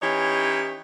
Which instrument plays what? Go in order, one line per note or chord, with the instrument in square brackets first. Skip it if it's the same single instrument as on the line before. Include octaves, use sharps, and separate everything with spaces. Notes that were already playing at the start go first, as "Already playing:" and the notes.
[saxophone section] E3 C#4 D#4 G4 C#5